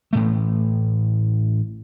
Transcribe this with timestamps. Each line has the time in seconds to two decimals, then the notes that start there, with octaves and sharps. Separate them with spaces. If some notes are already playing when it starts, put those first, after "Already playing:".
0.13 A1 A2 A3